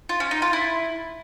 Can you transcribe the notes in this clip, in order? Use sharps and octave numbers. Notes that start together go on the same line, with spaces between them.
F4
C#4
D#4
F4
E4